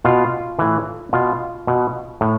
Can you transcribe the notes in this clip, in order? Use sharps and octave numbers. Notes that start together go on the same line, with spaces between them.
B2 F4
A2 E3
B2 F4
B2
A2